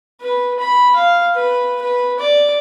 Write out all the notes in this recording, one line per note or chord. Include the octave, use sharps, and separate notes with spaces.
B4
B5
F5
B4
B4
D5